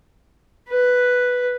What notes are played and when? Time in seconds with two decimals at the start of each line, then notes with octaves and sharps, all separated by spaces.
0.69 B4